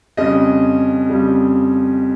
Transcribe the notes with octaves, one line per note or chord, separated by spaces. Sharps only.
F2 C#3 G3 D#5
F2 C#3 G3